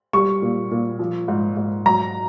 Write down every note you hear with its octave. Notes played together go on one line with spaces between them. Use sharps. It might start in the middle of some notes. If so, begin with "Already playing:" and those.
G3 C#6
A#2
A#2
F3
G#2
G#2
F#3 A#5